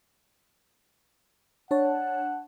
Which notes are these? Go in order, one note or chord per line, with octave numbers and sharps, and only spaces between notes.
D4 C#5 F#5 A5